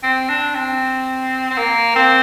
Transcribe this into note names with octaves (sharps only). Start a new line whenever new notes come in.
C4
D4
C4
C4
A#3
C4